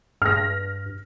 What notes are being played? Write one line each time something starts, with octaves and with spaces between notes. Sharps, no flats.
G2 F6 A#6